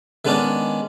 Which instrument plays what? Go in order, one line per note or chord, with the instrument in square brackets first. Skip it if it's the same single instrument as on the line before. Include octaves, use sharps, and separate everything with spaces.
[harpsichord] D#3 G#3 B3 C#4 D4